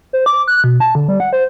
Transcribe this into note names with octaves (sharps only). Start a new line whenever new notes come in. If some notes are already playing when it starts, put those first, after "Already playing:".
C5
D6
F#6
B2
A5
D3
G3
F#5
C5